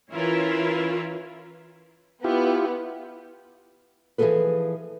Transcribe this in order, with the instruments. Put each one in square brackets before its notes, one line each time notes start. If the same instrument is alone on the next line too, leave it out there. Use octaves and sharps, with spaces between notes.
[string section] E3 C#4 E4 F4 A#4 B4
[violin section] B3 [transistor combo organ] E4 F4 G4
[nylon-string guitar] E3 F3 C4 G#4 A4 B4